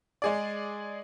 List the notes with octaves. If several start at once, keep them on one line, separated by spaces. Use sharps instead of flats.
G#3 G#4 D5